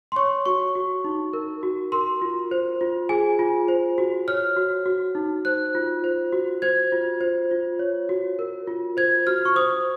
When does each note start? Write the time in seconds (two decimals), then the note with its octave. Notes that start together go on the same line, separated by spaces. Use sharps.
0.12 C6
0.16 C#5 C#6
0.46 F#4 C#6
0.75 F#4
1.04 D#4
1.33 A#4
1.63 F#4
1.92 A#4 C6
2.22 F4
2.51 C5
2.81 F4
3.09 G#4 G#5
3.39 F4
3.68 C5
3.98 F#4
4.28 C#5 F6
4.57 F#4
4.86 F#4
5.15 D#4
5.45 C5 F#6
5.75 F4
6.04 C5
6.32 F#4
6.62 C5 G#6
6.92 F4
7.21 C5
7.51 F4
7.79 C#5
8.09 F#4
8.39 A#4
8.67 F4
8.97 C5 G#6
9.27 F#4 F6
9.45 C#6
9.56 C5 D#6